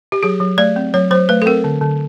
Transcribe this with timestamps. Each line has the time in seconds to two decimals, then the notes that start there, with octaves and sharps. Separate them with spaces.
0.12 G4
0.23 F#3 G#4
0.40 F#3
0.58 A3 D5
0.76 C4
0.94 F#3 C#5
1.11 F#3 C5
1.29 A3 B4
1.42 A4
1.46 C4 A#4
1.64 D3
1.81 D3